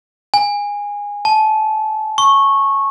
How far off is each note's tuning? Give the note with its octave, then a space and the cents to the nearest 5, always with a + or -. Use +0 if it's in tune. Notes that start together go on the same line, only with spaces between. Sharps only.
G#5 -20
A5 -25
C#6 -15